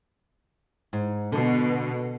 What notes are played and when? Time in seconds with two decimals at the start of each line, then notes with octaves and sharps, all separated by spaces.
0.93 G#2
1.32 B2 D3